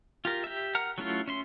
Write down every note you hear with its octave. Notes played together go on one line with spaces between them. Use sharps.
F4 G4 A#4
G4 E5
A#4 F#5 A#5 F6
F#3 A3 C#4 E4 F4
C#4 E5 C6